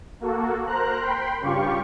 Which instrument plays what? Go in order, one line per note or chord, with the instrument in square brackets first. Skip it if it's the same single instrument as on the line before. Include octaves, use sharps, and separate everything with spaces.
[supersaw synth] A#3 F#4 A4
A#4 C5 A#5 F#6
G5 B5 C6
G2 C#3 F4 G4 C#6